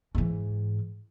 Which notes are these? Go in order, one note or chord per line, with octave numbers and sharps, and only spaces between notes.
G#2 E3